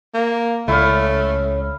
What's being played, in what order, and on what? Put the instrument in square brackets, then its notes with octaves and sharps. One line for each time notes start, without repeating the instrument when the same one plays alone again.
[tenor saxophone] A#3
[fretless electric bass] C#2 [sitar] A2 C#4 [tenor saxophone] A3 [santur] E4 F5